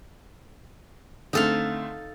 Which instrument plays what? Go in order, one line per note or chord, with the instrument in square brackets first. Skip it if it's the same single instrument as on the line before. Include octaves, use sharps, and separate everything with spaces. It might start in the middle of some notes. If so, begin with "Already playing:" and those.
[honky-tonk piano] D3 A3 C4 [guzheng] D#4 A4 F5